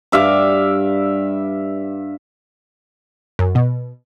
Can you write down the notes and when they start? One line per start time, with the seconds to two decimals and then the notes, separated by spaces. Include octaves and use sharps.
0.12 G2 E5 F5 D6
3.39 F#2
3.55 B2